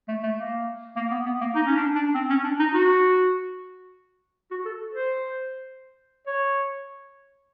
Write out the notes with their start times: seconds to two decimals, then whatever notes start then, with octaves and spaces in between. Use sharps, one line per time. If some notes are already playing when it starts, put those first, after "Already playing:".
0.08 A3
0.23 A3
0.38 A#3
0.96 A#3
1.11 B3
1.26 B3
1.41 A#3
1.55 D#4
1.66 C#4
1.76 D4
1.95 D4
2.14 C4
2.30 C#4
2.44 D4
2.59 D#4
2.74 F#4
4.51 F#4
4.66 A4
4.94 C5
6.27 C#5